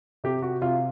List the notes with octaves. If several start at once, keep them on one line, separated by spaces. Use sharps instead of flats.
C3 G4
F#4
C3 F4